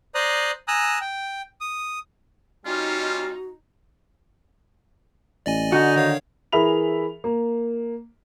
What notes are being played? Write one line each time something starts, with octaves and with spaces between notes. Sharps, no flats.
C5 D5 A#5 D#6 F#6
G#5 A#5 D#6 E6 F#6
G5
D#6
G3 C4 C#4 D#4 F4 F#4
A1 D5 D#5 G#5
D3 D#4 F#4
D#3 C#5 F5
E3 G#4 A#4 E5 B5 F7
A#3